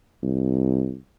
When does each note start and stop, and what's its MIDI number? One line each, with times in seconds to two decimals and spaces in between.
0.23 0.96 36